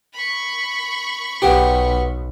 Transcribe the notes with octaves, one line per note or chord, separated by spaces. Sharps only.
B5 C#6
B1 B3 G4